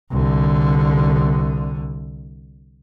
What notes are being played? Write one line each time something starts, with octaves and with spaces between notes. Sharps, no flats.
C2 D3